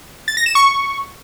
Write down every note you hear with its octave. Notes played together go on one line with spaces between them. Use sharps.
A6
A#6
E7
C#6